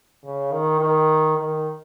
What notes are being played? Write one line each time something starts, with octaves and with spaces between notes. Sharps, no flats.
C#3
D#3
D#3
D#3